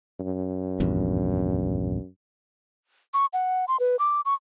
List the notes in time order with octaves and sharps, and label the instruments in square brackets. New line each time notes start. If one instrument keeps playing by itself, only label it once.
[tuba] F#2
[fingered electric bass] A#1 E2 G2
[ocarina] C#6
F#5
C6
B4
D6
C#6